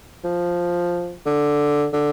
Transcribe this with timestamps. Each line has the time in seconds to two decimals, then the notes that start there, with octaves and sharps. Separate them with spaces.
0.24 F3
1.26 D3
1.93 D3